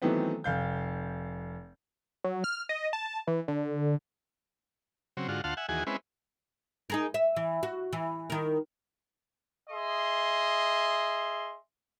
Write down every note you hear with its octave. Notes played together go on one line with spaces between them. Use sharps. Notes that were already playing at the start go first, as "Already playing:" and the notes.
D#3 E3 F#3 A3 B3 C4
F1 F5 G6
F#3
F6
D#5
A5
E3
D3
C#3 F#3 C4
G#2 D3 F4 F#4
D2 F4 F5 F#5 A5 C6
E5 F#5 G#5
D#2 E3 F#4 G#4 G#5
G#3 C4 C#4 E4 B4
D#4 G#4 A#4
E5
E3
F#4
E3
D#3 A#4
G#4 D#5 E5 C6